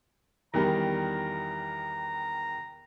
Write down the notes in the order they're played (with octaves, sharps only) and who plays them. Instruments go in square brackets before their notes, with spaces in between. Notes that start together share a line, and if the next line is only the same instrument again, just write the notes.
[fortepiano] E2 D#3 G3 [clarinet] A#5